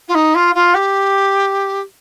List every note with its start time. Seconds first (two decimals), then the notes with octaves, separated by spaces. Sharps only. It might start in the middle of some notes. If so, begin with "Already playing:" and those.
0.08 F4
0.14 D#4
0.34 F4
0.55 F4
0.74 G4